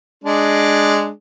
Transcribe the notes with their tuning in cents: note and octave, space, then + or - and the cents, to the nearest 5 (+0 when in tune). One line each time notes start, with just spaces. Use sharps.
G#3 +0 D4 +0